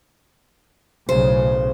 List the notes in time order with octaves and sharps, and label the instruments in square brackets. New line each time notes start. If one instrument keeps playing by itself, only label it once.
[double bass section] B1 A2 C#3 [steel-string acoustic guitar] C5